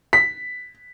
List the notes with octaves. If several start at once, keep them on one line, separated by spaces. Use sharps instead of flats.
B6